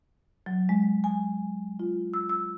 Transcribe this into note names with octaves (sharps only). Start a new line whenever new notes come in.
F#3
G#3
G#5
F4
E6
E6